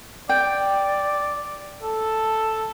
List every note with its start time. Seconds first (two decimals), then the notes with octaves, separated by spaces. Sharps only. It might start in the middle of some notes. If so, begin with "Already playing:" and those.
0.29 D5 G5
1.82 A4